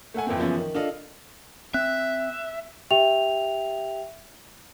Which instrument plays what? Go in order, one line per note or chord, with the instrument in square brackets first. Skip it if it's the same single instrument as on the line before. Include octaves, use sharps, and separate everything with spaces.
[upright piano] A3 A4 F#5 G#5
F2 E3 C4
F#2 C#3 E3 F3 B3 C#4
D#3
D4 F4 A4 D#5 F5
[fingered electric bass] C4 [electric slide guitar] E5 [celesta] F#6
[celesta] G4 E5 G5 F7